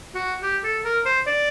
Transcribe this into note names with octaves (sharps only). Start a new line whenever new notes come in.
F#4
G4
A4
A#4
C5
D5